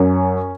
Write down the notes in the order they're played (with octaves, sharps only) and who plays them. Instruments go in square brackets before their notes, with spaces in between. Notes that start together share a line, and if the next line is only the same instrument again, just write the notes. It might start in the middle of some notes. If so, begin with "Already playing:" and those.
Already playing: [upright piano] F#2 C#4